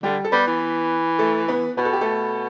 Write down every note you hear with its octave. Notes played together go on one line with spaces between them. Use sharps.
D3 G3 G4
A4
G3 B3 B4
E3
A3 A4
B3 B4
B2 B4
A4
G4
A3 A4